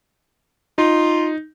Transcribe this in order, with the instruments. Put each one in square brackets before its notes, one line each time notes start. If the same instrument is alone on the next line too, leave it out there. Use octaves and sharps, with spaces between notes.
[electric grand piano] D#4 [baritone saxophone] F4